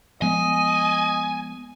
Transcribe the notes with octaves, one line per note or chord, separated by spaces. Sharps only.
F3 G#3 B3 D#5 G#5